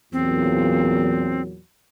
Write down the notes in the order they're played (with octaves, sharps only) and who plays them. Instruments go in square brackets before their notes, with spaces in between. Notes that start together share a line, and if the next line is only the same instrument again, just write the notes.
[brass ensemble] E2 A#2 F#3 [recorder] C4